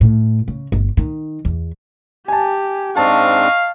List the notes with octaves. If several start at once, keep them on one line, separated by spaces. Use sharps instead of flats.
A2
C#3
G1
D#3
E2
G4 G#5 A5
G#2 C4 D4 D#5 F5 A5 C#6